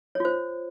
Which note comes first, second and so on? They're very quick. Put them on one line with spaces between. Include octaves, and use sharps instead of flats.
C#5 F4 C5